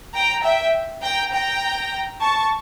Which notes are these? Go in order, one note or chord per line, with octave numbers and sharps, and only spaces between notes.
G5 A#5
E5 G5
G5 A#5
G5 A#5
A5 C#6